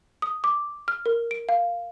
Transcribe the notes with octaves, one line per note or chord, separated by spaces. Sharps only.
D#6
D6
F6
A#4
D7
F5